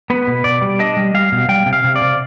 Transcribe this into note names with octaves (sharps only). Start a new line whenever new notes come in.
B3 B4
B2
B2 D5
G3
D4 D#5
G3
G3 F5
B2
G3 G5
C3
F5
C3
D5
C3